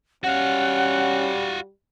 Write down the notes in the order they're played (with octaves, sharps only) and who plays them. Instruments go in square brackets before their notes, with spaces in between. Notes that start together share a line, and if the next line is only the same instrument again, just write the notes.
[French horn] G3 [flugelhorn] C#4 [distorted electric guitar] F#4 F5 [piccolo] F#5